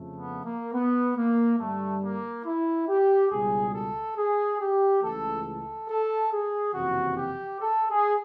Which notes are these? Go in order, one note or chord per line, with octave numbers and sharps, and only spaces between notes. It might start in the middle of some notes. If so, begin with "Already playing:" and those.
Already playing: F2 C#3 F3 A3
B3
A#3
B3
A#3
G2 D3 G3 A3
A#3
E4
G4
C#2 B2 G3 G#4
A4
G#4
G4
C#2 C#3 E3 A3 A4
A4
A4
G#4
F#1 F2 C3 E3 F#4
G4
A4
G#4